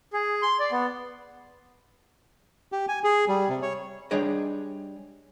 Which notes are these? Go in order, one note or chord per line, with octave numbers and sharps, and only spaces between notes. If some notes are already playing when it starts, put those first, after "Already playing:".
G#4
C6
D5
B3
G4
G#5
G#4
G3
C3
C#5
G3 D4 G#4 C#5 D#5